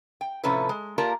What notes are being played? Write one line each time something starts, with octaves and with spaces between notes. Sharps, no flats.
G5
A2 C3 F3 C#4 A4 B4
G#3
A#3 F4 G4 A#4 D5 A5